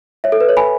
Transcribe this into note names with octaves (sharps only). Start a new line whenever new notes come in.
C#5 E5
A4
B4
C#5
G#5 B5